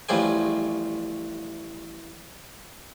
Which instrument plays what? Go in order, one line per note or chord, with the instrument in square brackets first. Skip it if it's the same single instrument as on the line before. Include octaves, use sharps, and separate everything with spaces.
[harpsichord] A1 A2 F3 G3 G#4 G#5